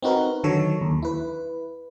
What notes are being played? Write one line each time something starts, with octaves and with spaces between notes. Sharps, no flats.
C4 D#4 F#4 A#4 B4
D3 D#3 F#3 A4 C#5
D#2
E4 B4